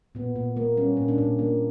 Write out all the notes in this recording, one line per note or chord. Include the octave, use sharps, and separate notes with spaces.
A#2 B3
A#2
A#3
G3 C#4
A#2
D4
A#2
A#3